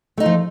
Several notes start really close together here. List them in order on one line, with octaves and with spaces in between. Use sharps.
A3 D#4 F4 F3